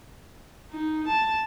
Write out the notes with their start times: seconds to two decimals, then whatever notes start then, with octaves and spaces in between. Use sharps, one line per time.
0.72 D#4
1.07 A5